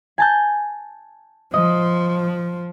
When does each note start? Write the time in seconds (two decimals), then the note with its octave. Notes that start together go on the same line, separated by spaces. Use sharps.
0.18 G#5 A5 G6
1.54 F3 D#5